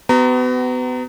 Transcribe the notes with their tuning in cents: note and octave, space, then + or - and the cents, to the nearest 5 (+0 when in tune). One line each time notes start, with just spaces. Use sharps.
B3 +30 F#4 +40 A#5 -15